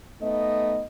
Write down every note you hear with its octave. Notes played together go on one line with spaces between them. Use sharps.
A3 B3 D#4 D#5